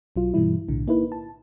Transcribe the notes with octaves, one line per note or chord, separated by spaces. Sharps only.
B1 F#3 F4
G2 B2 E3 G3 E4
B1 A2 D3
A#3 D#4 E4 B4
A5